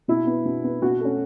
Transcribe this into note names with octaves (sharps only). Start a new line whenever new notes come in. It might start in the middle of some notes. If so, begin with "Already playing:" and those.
B2 E4
B3
B2
B3
B2 F#4
A3 C#4